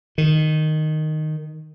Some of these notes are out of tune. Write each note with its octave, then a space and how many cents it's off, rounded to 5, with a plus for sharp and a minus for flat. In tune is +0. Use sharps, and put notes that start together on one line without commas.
D#3 -5